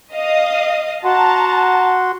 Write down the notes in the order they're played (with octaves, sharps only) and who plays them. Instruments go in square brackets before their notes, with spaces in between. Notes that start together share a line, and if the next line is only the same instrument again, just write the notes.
[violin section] D#5 F5 D#6
[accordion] F#4 F#5 C6 [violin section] A5 A#5